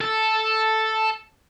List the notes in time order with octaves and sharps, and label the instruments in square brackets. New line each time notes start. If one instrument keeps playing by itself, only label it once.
[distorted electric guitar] A4